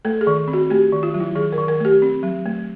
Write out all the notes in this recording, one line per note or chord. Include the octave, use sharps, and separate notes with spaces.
A3 A4
G#4
D#3
C4
F#4
A3 G4
D#3
F4
F#3
E4
D#3 G#4
A#4
D#3
A#4
A3 G4
C4
F#3
A3